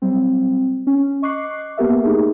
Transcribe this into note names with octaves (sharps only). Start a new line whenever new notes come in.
F#3 G3 C4
C#4
D#5 C#6 D6 F#6 C7
A#3 B3 G4 A#4 E5
A3 D#4 G4 G#4